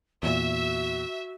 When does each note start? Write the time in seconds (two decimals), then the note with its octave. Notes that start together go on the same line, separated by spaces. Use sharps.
0.23 E2 A#2 F#4 E5